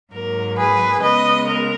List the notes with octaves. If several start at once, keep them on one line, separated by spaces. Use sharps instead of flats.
G#2 F#3 A#3 A#4
G#4 B4
C#3 G#3 B3 B4 D#5
A#4